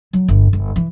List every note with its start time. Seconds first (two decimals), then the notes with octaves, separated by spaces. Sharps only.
0.13 F#3
0.28 G1
0.53 G1
0.76 E3